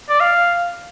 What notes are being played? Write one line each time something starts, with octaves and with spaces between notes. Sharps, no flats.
D5
F5